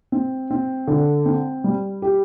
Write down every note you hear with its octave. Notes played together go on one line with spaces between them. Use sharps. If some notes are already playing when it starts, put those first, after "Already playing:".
C4
C4
D3
C4
G3
G4